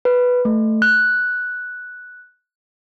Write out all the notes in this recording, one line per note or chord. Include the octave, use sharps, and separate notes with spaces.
B4
A3
F#6